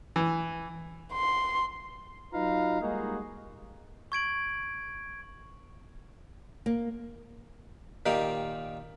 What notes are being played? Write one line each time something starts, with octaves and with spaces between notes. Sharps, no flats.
E3
C6
F#3 D#4 F4 B4 F5 A#5
G3 G#3 A#3 D#4 F#4 G#4
C#6 G#6 D7 F#7
A#3
A#2 D#3 G4